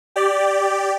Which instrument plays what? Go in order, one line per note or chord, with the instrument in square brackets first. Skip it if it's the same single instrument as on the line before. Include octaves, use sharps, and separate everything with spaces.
[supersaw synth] G4 D5